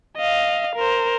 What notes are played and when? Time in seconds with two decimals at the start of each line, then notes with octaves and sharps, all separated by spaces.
0.17 D#5 F5
0.76 A#4 C5